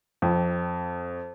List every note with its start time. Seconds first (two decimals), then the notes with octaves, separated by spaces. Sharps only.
0.22 F2